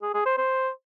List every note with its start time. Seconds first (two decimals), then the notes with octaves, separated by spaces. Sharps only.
0.02 G#4
0.14 G#4
0.26 C5
0.37 C5